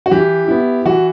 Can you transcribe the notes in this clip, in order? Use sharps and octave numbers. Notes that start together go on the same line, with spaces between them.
F#4
E3 G4
B3 E4
E3 F#4